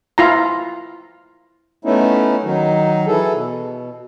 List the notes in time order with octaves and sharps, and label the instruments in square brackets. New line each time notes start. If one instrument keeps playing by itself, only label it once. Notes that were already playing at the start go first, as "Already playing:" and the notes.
[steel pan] E4 F4 A#5
[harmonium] A3 B3 C#4 D#4 E4
D#3 F#3 D#4
E3 G#4 A4
B2